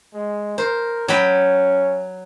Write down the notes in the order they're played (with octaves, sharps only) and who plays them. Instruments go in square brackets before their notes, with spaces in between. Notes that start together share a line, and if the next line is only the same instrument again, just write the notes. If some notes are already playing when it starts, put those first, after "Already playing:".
[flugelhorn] G#3
[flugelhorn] A#4 [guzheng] C5
[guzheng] F#3 G5 B5 [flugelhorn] C#4